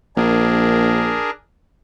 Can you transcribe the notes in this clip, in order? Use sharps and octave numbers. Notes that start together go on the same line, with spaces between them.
A#1 D4 G#4 A#4